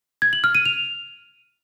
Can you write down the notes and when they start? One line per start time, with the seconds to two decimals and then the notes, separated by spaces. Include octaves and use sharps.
0.22 G#6
0.33 F#7
0.44 F6
0.55 D#7
0.66 F7